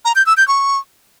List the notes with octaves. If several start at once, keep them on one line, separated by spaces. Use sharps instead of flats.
A#5
G6
E6
G6
C#6